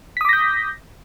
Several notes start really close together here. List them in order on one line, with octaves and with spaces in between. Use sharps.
B6 D#6 D6 A#6 G6